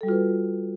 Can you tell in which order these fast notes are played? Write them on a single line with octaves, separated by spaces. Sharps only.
A4 G3 F#4 F4 B4